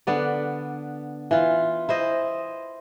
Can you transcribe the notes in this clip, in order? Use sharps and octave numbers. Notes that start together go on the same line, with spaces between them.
D3 B3 D5
E3 F4
E4 C5 D#5